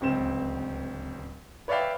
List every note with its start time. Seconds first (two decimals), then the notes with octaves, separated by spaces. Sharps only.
0.01 D1 C#2 C4 E7
1.68 B4 C#5 D5 E5 F5 G5